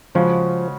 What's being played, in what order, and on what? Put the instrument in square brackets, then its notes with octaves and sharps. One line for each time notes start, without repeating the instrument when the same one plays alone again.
[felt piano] C#3 G#3 C#4 F#4 [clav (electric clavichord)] F3